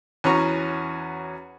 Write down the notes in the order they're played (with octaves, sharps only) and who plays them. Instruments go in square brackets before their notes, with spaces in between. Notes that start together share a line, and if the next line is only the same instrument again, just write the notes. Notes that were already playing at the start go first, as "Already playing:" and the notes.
[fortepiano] E2 C#4 F#4 A#5 C#6